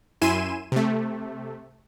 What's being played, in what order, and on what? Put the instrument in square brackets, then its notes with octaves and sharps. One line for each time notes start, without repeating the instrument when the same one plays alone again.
[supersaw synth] F#2 E4 G#5 C6 D#7 E7
C3 A3